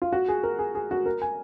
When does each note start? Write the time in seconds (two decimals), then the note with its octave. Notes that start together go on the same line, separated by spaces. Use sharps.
0.02 F4
0.13 F#4
0.28 G#4
0.43 A#4
0.59 G#4
0.75 G#4
0.91 F#4
1.06 A#4
1.22 G#5